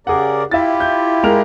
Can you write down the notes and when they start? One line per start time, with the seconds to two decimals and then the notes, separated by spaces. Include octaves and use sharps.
0.07 C#3 G4 G#4 A#4 D5 F#5
0.51 E4 F4 G4 E5 A6
0.80 G6
1.23 G#3 A#4 F7